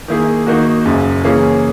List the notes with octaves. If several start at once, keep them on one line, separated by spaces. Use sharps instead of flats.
D#3 A#3 E4 G#4
D#3 A#3 D#4 F#4
F#1 F#2 C#3
C#3 E3 A#3 C#4 G#4